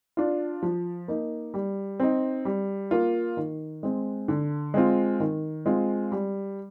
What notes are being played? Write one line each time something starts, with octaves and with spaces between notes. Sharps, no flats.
D4 F4
F3
A#3 D#4
G3
C4 D#4
G3
A#3 F4
D#3
G#3 C4
D3
G#3 C4 F4
D#3
G#3 C4 F4
G3